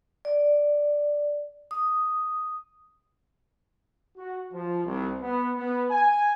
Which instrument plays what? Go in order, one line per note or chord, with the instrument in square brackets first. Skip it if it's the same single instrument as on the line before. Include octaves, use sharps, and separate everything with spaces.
[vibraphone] D5
D#6
[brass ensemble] F#4
F3
C2
B3
B3
G#5